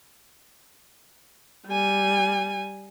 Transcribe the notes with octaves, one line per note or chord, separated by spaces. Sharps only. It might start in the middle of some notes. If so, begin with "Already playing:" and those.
G3 G#5